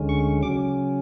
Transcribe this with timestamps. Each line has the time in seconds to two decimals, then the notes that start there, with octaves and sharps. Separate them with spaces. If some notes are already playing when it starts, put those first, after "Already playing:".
Already playing: D2 D3 G#3 C#4
0.09 C#6
0.43 C#3 F#3 C#4 D6